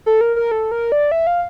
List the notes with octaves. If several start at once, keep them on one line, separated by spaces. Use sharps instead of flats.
A4
A#4
A#4
A4
A#4
D5
E5
F5